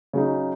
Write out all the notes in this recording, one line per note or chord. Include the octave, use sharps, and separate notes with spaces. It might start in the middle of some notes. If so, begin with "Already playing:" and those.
C#3 F#3 D#4